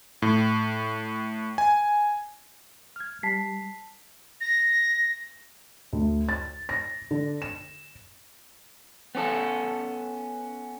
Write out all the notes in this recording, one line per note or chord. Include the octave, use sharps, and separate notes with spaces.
A2
G#5
F6 G#6
G3 A5 B6 C7
A#6
D2
A6
A#6
D3
E7
B3 C#4 G4 A4